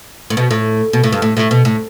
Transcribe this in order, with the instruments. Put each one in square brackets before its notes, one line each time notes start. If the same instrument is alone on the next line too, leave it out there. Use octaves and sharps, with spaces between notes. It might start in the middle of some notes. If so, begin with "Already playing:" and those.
[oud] A2
B2
A2
B2
A2
G2
A2
A2
B2
A2